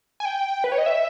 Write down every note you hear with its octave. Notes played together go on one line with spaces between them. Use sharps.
G#5
G5
B4
C#5
D#5
E5